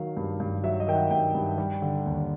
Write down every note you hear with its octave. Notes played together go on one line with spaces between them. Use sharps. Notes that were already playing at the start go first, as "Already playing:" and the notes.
Already playing: D#3 F#3 F5
G2
G2
F#3 E5
D#5
D#3 G5
F#5
G2 G5
G2
G3
D3
D#2